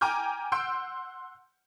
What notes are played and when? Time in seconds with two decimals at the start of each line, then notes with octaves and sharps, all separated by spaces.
0.01 G5 G#5 A#5 D6 F6 G6
0.52 F#5 C6 E6 G6 D7